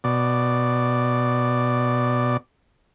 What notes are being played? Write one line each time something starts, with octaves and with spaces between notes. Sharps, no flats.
B2 D5